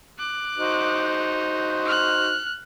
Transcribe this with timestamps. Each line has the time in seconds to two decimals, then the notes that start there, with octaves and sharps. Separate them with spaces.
0.19 D6 F#6
0.58 D#4 F#4 C5
1.86 F6 F#6